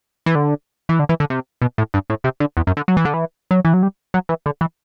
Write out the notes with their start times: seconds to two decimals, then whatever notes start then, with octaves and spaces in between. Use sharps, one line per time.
0.26 E3
0.35 D3
0.89 E3
0.99 D3
1.09 E3
1.20 D3
1.30 C3
1.62 B2
1.78 A2
1.94 G2
2.10 A2
2.24 C3
2.40 D3
2.57 E2
2.67 F#2
2.77 D3
2.88 F#3
2.97 E3
3.05 D3
3.14 E3
3.51 F#3
3.65 E3
3.73 F#3
3.83 G3
4.14 F#3
4.29 E3
4.46 D3
4.61 E3